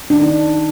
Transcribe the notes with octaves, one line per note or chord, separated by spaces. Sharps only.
D#3 D4
D#4